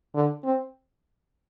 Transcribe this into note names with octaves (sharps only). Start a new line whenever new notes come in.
D3
C4